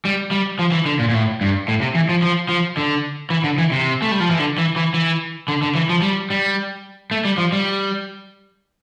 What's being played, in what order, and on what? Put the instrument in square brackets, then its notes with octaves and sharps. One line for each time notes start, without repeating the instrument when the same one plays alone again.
[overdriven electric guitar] G3
G3
F3
E3
D3
A#2
A#2
A2
G2
A2
C3
E3
F3
F3
F3
D3
E3
D3
E3
C3
A3
G3
F3
E3
D3
E3
E3
E3
D3
D3
E3
F3
G3
G3
A3
G3
F3
G3